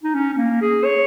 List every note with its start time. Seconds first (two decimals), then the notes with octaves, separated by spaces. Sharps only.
0.03 D#4
0.14 C#4
0.33 C#4
0.37 A#3
0.62 G#4
0.84 C#5